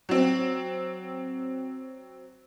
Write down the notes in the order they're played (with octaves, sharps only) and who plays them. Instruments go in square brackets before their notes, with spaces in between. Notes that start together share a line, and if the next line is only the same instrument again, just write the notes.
[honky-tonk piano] F#3 C4